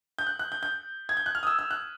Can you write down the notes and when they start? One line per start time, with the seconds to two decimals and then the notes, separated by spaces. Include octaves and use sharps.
0.19 G6
0.27 F#6
0.39 F#6
0.52 G6
0.63 G6
1.09 G#6
1.17 G6
1.26 F#6
1.35 F6
1.43 D#6
1.47 E6
1.59 E6
1.71 F#6